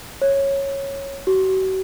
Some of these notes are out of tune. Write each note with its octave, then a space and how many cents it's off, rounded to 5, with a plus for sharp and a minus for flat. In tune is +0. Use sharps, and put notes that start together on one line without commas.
C#5 -10
F#4 +40